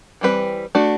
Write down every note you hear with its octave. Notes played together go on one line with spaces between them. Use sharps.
E3 G3 C4 F#4 B4
A3 D4 F#4